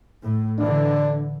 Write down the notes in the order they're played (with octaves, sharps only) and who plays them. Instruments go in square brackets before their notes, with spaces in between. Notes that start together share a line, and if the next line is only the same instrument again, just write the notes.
[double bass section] A2
[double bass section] D3 E3 [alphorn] D4